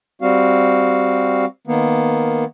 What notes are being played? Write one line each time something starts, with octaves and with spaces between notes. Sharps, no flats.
G3 C4 F#4 F5
D#3 A#3 B3